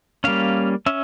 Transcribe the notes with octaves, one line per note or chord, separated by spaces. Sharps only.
G3 A#3 C#4 F5
C#4 E5